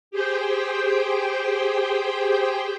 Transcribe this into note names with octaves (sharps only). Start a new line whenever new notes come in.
G4 G#4 C5 G5